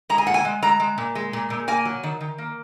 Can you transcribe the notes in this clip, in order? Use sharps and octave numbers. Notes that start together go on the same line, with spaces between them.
G#3 A#5
G#5
A#2 F#5
G#5
G#3
G#3 A#5
G#3
A#2
G#3
A#2
A#2
A#3 G#5
F#3
D#3
D#3
A#3